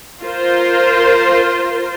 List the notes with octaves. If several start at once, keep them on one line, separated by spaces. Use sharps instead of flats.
F4 A#4 C5